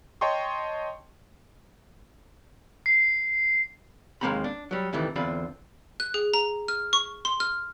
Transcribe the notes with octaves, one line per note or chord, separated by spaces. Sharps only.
C#5 D#5 G5 A5 C6 C#6
C7
D#2 G#3 A#3 C4 A#5 B5
D4
F#3 G3
D2 C3 D#3 E3 A3
E2 D3 C4 F4 B5
F#6
G#4
A#5
F6
C#6
C6
F6